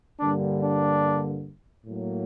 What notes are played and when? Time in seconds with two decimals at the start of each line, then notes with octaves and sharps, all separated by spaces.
0.20 G2 D3 G3 A#3 D4
0.62 D4
1.86 A2 F#3 A#3